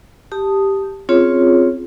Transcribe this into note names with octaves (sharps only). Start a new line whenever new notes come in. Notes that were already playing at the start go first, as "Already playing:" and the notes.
G4 A5 D#6
C4 C#4 F4 G#4 C#5